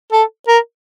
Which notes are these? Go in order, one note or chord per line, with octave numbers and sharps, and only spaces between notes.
A4
A#4